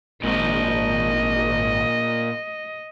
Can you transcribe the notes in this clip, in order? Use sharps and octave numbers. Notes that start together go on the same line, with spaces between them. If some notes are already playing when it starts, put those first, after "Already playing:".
G#1 A#2 C5 D#5